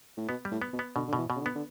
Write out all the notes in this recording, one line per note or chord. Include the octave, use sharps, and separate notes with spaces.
A2
B2 B3
G3
A2
B3
B2
B3
B2 D3
D3
B2
E3
B2
C#3
D3
B3
D3